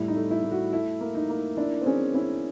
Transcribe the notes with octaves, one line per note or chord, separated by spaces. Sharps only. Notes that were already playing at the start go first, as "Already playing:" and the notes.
Already playing: A2 G3 E4
D#4
A3
E4
A3
F#4
E4 A4
A#3
D#4
A#3
D4 E4
C4
C#4 G#4
C#4 E4